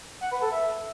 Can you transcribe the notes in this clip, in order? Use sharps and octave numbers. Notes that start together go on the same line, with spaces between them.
F#5
B4
A4
E5